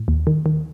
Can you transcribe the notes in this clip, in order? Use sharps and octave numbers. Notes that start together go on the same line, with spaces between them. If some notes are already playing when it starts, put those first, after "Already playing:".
Already playing: A2
D#2
D#3
D#3